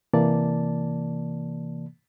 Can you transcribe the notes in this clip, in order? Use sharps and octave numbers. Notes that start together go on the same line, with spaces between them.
C3 E3 A#3 D5 A5